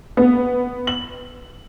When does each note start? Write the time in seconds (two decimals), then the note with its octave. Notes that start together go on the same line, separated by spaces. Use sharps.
0.17 B3
0.87 F#7